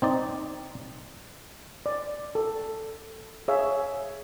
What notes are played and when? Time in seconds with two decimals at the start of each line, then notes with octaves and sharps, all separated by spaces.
0.02 C4 D#4 D5
1.86 D5
2.35 A4
3.48 G#4 C#5 E5 F5